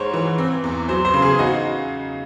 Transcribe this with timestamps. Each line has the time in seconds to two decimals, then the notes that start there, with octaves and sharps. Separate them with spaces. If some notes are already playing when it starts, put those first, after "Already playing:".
Already playing: G#2 G#3 C5 C#5
0.14 E3
0.38 C4
0.64 E2
0.89 F#3 C5
1.05 C5
1.14 C#3
1.22 G#4
1.39 D#4 F#4